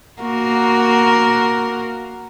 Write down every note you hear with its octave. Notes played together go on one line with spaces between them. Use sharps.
A#3 F#4 A#4